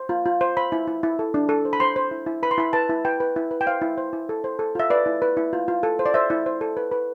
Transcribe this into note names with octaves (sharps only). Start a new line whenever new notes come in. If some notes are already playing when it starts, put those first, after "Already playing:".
Already playing: C5
F4
F4
C5
C5 B5
E4
E4
E4
A4
D4
A4
C5
B5
C5 C6
C5
E4
E4
B4 B5
C6
E4 B5
B4 A5
E4
B4 G5
B4
E4
B4
G5
C5 F5
E4
C5
E4
A4
C5
A4
F4 E5
B4 D5
E4
B4
E4
F4
F4
A4
C5
D5
C5 E5
E4
C5
A4
B4
B4